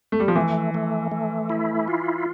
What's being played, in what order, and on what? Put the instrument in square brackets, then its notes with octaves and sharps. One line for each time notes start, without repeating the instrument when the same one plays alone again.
[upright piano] A3
G3
F3
[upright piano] E3 [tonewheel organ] A3
[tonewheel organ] A3
A3
E4
F4